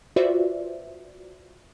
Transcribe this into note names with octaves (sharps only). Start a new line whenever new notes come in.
F4 F#4 B4 C5 D5 E5